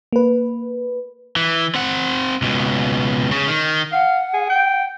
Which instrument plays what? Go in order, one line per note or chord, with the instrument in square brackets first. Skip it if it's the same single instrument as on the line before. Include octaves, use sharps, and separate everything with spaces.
[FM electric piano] A#3 B4
[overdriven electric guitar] E3
C4 F#5
C#2 B2
C#3
D#3
[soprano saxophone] F5 [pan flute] F#5
[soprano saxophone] G#4
G5